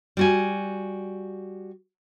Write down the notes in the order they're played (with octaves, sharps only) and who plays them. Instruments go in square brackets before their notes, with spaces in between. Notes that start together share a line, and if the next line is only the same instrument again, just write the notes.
[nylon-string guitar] G3 F#4 G#5